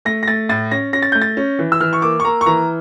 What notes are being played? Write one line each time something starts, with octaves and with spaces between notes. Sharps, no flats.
A3 A#6
A#6
A3 A6
A2 A6
C#4 A#6
C#4 A#6
A6
A3 G6
A6
C#4
E3
E6
E3 F6
C#6
A#3 D6
C#6
A#3 A#5
C#6
E3 A#5